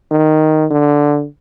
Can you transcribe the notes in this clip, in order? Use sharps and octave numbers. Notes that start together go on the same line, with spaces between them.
D#3
D3